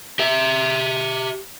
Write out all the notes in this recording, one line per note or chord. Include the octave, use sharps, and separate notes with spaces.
G4 E5